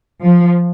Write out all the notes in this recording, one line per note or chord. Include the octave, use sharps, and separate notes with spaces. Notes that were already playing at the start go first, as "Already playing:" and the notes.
F3